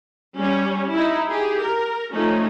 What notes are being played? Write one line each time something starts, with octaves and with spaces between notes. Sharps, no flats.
G3 C#4
D#4 E4
G4 G#4
A#4
F3 A3 C#4 D#4